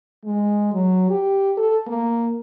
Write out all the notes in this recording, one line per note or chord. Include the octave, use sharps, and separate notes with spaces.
G#3
F#3
G4
A4
A#3